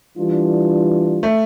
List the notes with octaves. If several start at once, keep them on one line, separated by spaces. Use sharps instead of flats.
E3 G3 D4 F4
A3